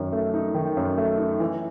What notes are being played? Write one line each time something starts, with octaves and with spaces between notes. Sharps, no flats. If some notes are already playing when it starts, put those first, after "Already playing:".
Already playing: F#2 D#3
A3
D#4
D#3
F#2
A3
D#4
E3